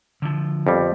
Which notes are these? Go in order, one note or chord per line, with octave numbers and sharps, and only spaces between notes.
D3 F3
F2 G3 B3